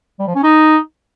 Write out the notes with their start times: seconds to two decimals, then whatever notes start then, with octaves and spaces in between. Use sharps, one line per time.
0.19 G3
0.27 F3
0.35 C#4
0.43 D#4